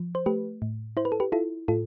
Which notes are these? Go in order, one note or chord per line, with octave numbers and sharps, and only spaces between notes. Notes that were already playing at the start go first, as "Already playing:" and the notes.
Already playing: F3
C5
A3 G4 B4
A2
E4 C5
B4
A4
G4 B4
E4 F4 A4
A2 F4 A4